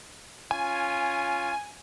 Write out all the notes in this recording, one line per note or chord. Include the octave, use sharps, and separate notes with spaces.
C#4 F4 G#5